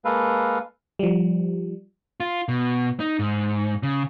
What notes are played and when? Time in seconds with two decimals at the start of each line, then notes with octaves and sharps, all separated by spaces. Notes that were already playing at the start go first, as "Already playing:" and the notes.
0.05 G#3 A#3 A4 B4 F5
0.99 F3 G3
2.20 F4
2.48 B2
3.00 D#4
3.19 G#2
3.83 C#3